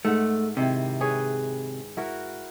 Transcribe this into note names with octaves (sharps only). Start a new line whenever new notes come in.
G#2 A3 A#4 F#5
C3 D#3 E4
G#4 B4 C#5
E4 F#4 A#4